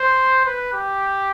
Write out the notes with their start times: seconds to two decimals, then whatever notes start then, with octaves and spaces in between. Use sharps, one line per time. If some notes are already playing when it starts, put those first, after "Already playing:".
Already playing: C5
0.46 B4
0.73 G4